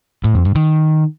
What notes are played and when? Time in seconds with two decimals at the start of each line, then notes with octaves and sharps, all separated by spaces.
0.24 A2
0.35 F2
0.45 G2
0.55 D#3